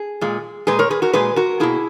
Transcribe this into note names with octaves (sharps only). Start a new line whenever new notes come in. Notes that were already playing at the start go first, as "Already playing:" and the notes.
Already playing: G#4
A#2 G#3
A#2 G#3 G#4 B4
A#4 C#5
G#4 B4
F#4 A#4
A#2 G#3 G#4 B4
F#4 A#4
B2 A#3 E4 G#4